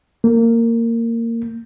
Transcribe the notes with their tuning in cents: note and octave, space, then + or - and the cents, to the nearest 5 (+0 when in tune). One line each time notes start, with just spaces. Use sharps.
A#3 -20